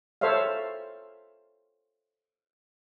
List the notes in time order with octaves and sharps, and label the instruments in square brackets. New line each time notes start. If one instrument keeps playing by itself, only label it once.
[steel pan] A4 C5 C#5 E5 F5